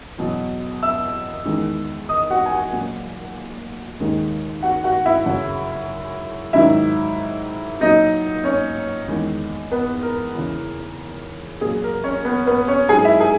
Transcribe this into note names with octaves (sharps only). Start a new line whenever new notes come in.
E2 B2 F#3
E5 E6
E2 D#3 G#3
D#5 D#6
F#4 F#5
G#5
F#4 F#5
A#2 F#3
D#2 D#3 G#3
F#4 F#5
F#4 F#5
E4 E5
F#2 C#3 F#3
G#2 D#3 F#3 E4 E5
A#2 F#3 D#4 D#5
C#4 C#5
E2 D#3 G#3
B3 B4
A#4
E2 C#3 E3
A#2 F#3 G#4
A#4
C#4 C#5
B3 B4
B3 B4
C#4 C#5
G#2 F#3 G#4 G#5
E4 E5
G#4 G#5